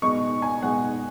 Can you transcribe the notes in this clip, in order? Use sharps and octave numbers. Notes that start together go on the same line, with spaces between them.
B2 G#3 D#4 C#6
G#5
B2 G#3 D#4 F#5